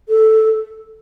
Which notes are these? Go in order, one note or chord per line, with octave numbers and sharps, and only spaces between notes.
A4